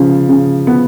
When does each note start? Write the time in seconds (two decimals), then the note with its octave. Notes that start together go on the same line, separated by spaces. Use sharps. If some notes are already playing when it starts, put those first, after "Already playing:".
Already playing: C#3 F3
0.29 C#3
0.67 B3